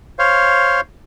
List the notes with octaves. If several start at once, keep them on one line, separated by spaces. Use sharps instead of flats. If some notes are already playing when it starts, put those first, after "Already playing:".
C5 C#5 F5